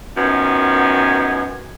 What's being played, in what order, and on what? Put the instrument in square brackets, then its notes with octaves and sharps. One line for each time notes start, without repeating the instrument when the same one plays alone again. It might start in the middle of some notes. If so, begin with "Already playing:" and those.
[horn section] F#2 D#3 F3 B3 G#5